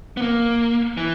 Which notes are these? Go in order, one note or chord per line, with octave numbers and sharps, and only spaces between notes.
B3
A#3
E3